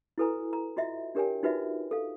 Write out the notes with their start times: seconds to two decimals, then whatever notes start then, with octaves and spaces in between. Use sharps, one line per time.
0.18 E4 F#4 A4 B4 G#5 A#5
0.53 A#5
0.77 F4 F#4 D#5 E5
1.15 D4 G4 A#4 C#5 G5 G#5
1.43 D#4 F4 F#4 B4 D5 E5
1.91 A4 F5